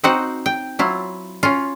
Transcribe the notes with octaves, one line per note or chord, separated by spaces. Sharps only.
C4 D#4 F#4 C5 F#5
G5
F#3 E4 F4
C#4 F4